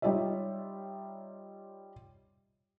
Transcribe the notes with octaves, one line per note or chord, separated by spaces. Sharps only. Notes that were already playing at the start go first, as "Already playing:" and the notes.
G3 D#4 F4 C#5 E5